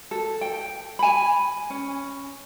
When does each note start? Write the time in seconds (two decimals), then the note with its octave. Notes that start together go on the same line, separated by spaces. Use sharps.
0.11 A4
0.41 G5
0.99 G#5 B5
1.70 C#4